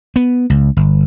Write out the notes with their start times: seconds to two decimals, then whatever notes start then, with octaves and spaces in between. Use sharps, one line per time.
0.16 B3
0.50 C#2
0.77 G1